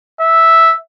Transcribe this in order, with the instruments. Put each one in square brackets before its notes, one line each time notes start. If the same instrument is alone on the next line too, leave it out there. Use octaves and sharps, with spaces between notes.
[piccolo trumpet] E5